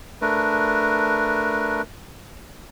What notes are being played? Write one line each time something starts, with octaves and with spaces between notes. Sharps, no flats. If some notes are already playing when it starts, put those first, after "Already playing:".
A3 D4 A#4 B4